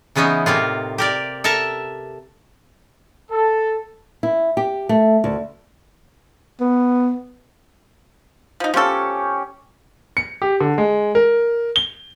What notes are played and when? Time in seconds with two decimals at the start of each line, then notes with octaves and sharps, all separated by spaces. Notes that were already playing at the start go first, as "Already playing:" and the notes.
0.16 C#3 E3 B3 C#4 D#4
0.46 A2 C3 A#3 F4
0.98 G4 A#4 D5
1.44 A4 A#4 E5 A5 A#5
3.31 A4
4.23 E4
4.57 G4
4.89 A3
5.24 D2
6.60 B3
8.60 F3 D#4
8.74 F3 C#4 G4 A4
10.17 C#7
10.42 G4
10.61 D3
10.78 G#3
11.15 A#4
11.76 G7